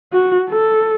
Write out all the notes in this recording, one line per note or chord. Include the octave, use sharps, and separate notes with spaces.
F#4
A4